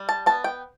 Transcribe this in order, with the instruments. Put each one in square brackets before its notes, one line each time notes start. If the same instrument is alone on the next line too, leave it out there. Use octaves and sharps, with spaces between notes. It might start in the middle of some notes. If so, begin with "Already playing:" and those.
Already playing: [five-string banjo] G3
A5
B3 A5
G5